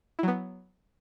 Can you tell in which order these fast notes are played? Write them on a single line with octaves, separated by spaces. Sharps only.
E4 F#3 B3